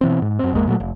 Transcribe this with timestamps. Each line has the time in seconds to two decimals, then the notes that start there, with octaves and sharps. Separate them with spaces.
0.01 B2 E3 C4
0.22 G#2
0.39 F#2 C4
0.53 G#1 E2 G#3 A#3
0.67 A#2 F#3 A3
0.80 F1